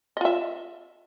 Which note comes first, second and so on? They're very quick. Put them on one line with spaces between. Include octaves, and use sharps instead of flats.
D#5 F4 E5